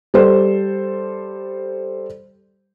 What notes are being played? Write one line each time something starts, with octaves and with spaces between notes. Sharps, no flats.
G3 A4 C5